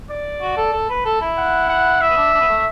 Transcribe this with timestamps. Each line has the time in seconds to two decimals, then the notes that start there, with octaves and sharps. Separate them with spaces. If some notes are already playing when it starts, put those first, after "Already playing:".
0.10 D5
0.41 F#4
0.57 A4
0.73 A4
0.90 B4
1.05 A4
1.21 E4
1.37 F#5
1.69 F#5
2.00 E4 E5
2.09 B3
2.17 D4
2.34 D4
2.41 B3
2.49 A3